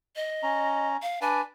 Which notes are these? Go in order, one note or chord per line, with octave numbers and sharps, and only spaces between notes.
D#5
C#4 A#5
F5
D4 B4 D5 G#5